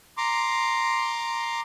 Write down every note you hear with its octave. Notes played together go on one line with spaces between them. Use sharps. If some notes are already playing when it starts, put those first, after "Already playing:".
A#5 C6 D6